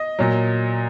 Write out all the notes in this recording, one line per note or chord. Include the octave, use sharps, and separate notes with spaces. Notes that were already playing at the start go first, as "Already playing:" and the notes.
Already playing: D#5
A#2 F#3